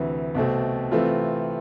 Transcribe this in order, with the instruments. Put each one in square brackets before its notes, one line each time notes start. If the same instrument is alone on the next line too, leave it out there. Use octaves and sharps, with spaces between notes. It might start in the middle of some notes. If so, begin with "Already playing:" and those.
Already playing: [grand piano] D2 C3 E3
C2 B2 A3 C4
C3 E3 A3 C4 F4